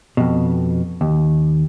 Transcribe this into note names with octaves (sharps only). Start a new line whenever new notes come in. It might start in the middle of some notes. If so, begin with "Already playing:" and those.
F2 B2
D#2